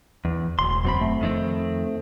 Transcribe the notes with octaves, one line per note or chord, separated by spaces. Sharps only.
E2
E1 D2 C6
F#2 C4 B5
A3
F2 D#3 C4